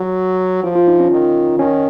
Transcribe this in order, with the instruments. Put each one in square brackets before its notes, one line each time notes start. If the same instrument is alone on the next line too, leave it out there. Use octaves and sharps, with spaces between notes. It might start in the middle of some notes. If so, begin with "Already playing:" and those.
Already playing: [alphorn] F#3
[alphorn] F3 [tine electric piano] F4
[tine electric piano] F4
D#4
C#4
[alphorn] D#3
[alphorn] D#3 [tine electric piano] C#4